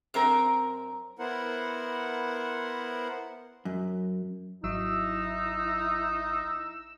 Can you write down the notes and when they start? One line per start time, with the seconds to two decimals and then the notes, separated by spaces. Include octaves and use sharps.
0.14 F#2 C4 A#4
1.19 B3 E4 A#4 C5 F#5
3.65 F#2
4.64 G#1 F#3 D#4 E4 E6